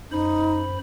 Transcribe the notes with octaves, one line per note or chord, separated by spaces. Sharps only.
F#2 D#4 C5 B5